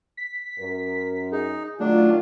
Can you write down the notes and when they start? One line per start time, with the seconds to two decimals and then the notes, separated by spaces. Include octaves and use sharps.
0.17 B6
0.58 F#2 A#4
1.32 D#4 G#4
1.80 D#3 F#3 A3 D4 F4